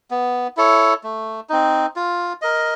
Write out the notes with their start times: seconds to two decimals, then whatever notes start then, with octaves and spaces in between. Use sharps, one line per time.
0.10 B3
0.57 E4 A4 C#5
1.03 A3
1.49 C4 D#4
1.96 F4
2.42 A#4 D#5